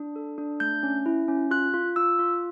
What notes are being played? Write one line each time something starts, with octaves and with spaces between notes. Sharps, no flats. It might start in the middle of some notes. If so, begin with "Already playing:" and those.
Already playing: D4
A4
D4
A3 G6
C#4
E4
C#4
F4 F#6
F4
F4 E6
F4